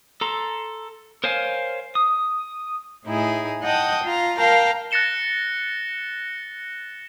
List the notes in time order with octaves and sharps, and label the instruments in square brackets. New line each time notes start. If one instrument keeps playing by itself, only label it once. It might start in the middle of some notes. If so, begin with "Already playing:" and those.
[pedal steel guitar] A4 A#5 C6
A#4 C5 C#5 F5 G#5
D#6
[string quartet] A2 D#4 E4 G#4
D#5 F#5 G5 A5 D#6
F4 A#5
A#4 F5 G5 A5 A#5
[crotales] F#6 A6 A#6 C#7 E7 G7